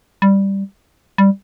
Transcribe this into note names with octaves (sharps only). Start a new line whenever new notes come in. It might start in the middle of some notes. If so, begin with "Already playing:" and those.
G3
G3